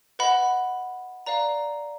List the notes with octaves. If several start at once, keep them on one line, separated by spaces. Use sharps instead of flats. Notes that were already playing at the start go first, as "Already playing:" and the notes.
B4 D#5 F#5 B5
B4 D5 F5 A#5